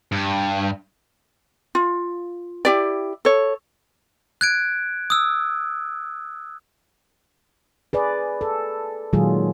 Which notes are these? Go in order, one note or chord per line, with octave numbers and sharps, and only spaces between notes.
G2
F4
E4 G4 D5
A4 C#5
F#6 G#6 D7
D#6 E6
G#4 B4 D5
A4
A#2 D#3 F#3 G#3 F4 G#4